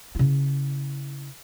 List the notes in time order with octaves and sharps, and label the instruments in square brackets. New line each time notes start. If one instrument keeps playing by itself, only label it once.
[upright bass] C#3 E4